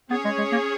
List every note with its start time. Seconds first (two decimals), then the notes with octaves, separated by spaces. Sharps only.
0.10 B3 C#4 G#4 C#5
0.25 G#3
0.38 G#3
0.52 A#3